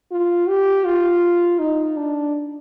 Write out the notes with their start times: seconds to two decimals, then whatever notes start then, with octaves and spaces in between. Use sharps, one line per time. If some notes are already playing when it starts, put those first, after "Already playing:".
0.12 F4
0.48 G4
0.85 F4
1.59 D#4
1.96 D4